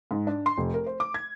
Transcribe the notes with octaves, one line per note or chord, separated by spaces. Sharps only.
G#2
D4
C6
F1
A#4
C5
D6
G#6